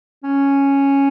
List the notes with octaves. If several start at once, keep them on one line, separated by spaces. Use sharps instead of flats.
C#4